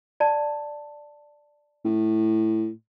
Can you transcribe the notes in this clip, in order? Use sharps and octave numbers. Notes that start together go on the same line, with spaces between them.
D5 A5
A2